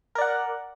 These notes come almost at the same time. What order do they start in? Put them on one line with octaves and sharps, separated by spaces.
A#4 D5 F#5